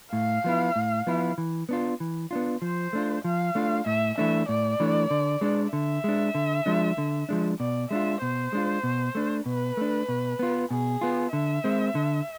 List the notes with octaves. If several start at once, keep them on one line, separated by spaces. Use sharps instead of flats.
A2 F5
F3 B3 E4
A2
F3 B3 E4
E3
B3 D4 F4
E3
B3 D4 F4
F3 C5
A3 D4 F4
F3 F5
A3 D4 F4
A2 E5
E3 A3 D4 E5
A2 D5
E3 A3 D4
D3
G#3 D4
D3 E5
G#3 D4
D3
F3 G#3 D4
D3
F3 G#3 D4
B2 D5
G#3 D4 F4 E5
B2 C5
G#3 D4 F4
B2
A3 D4
B2 B4
A3 D4
B2
B3 F4
B2 G#4
B3 F4
D3 E5
G#3 C4
D3